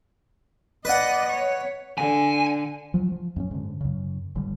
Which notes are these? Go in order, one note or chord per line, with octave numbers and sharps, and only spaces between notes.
B4 D5 D#5 F#5
C#5
D3 G#5
F3 F#3
F3
F#2 B3 C#4
G#2 D3
F#2 C#3
G1 D3 G3